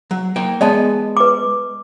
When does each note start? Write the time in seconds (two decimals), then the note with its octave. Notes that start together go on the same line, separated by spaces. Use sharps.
0.11 F#3
0.36 A#3 G5
0.61 G#3 B3 D5 D#5 A5
1.17 B4 D6